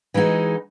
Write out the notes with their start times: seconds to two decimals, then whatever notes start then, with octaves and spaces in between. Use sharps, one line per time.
0.14 E3 G#3 D#4 F#4